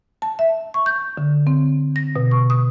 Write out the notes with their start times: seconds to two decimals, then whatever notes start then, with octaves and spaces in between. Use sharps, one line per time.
0.22 A5
0.39 E5
0.74 C#6
0.86 G6
1.17 D3
1.47 C4
1.96 A#6
2.16 B2
2.31 C#6
2.50 D#6